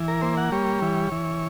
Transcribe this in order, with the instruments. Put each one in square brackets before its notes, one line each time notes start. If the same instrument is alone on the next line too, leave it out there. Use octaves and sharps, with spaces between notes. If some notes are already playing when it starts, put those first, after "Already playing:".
Already playing: [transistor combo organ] E3
A#4
A#3 C5
F#5
G3 C#5
E3
E3